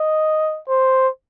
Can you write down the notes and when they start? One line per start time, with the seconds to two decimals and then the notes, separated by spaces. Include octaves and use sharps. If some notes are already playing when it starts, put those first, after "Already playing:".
Already playing: D#5
0.69 C5